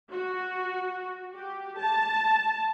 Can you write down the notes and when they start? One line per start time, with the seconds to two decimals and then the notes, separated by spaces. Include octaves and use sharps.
0.12 F#4
1.36 G4
1.80 A5